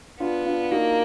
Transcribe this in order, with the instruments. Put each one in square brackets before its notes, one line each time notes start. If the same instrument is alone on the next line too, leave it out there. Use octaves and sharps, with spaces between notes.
[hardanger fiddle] B3 [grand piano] D4 F4
[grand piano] D4 F4
[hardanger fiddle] A#3 [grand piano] D#4 F#4